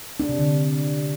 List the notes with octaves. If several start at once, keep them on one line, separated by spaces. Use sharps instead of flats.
D4
C3
D3